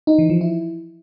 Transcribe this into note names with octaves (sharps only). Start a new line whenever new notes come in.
D#4
E3
F3
E4